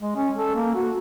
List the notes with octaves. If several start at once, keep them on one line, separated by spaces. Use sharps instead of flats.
G#3
C#4
A4
A#3
F#4